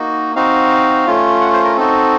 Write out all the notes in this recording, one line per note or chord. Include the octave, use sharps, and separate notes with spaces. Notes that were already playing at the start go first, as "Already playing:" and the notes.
Already playing: A#3 D#4 F#4
C4 D#4 F#4 F5
A3 C#4 F4
F#5
C5
A#4
C4 D#4 F#4 A4